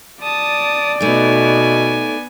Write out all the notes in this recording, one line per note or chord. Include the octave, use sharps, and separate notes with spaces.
D5 A5 D#6
B2 A3 B3 D#4 G#5